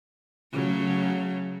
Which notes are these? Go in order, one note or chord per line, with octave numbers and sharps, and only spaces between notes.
C#3 F#3 A3